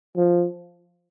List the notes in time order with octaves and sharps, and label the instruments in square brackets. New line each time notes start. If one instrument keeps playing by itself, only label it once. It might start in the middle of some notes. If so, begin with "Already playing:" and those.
[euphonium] F3